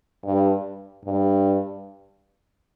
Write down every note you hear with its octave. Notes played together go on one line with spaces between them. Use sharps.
G2
G2